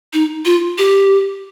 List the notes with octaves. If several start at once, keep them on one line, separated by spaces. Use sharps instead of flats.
D#4
F4
G4